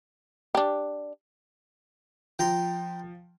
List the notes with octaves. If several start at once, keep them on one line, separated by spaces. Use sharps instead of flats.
D4 G4
F3 G5 A#5 C6